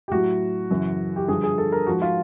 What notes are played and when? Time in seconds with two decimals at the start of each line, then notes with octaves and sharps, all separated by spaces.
0.08 G4
0.11 A2 F#3 F#4
0.71 F#2 C#3 E3
1.16 G4
1.28 G2 D3 F3 G#4
1.44 G#4
1.58 A4
1.72 A#4
1.87 G#2 F3 F#4
2.02 F4